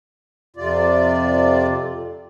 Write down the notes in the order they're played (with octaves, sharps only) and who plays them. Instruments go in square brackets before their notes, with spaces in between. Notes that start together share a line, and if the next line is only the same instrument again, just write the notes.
[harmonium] F2 C3 F4 D5